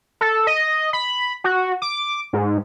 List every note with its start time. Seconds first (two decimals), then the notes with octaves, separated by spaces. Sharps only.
0.21 A4
0.47 D#5
0.93 B5
1.44 F#4
1.82 D6
2.33 G#2